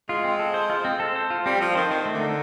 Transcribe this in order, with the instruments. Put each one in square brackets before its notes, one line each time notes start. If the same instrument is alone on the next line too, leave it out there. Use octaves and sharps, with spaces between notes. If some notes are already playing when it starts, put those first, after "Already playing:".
[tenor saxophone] G#3 [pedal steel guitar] F4
[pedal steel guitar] C4
A4
C5
F4
C4
A4
C5
F4
[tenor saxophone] G3 [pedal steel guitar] C4
[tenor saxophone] F3 [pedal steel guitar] A4
[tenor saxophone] D#3 [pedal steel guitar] C5
[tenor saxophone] D#3 [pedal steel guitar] C4
[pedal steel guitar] A3
[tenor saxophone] D3
[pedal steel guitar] D#4